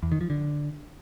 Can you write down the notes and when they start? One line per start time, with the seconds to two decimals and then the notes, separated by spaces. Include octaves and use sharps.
0.03 E2
0.12 D#3
0.21 F3
0.30 D3